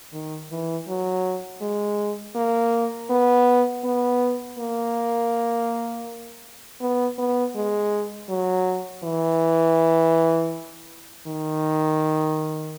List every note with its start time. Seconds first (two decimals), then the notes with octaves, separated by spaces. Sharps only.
0.13 D#3
0.51 E3
0.88 F#3
1.61 G#3
2.35 A#3
3.10 B3
3.84 B3
4.59 A#3
6.81 B3
7.18 B3
7.56 G#3
8.29 F#3
9.04 E3
11.27 D#3